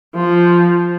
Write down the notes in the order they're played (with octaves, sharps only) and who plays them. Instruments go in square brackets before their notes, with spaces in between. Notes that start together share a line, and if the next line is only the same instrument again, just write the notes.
[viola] F3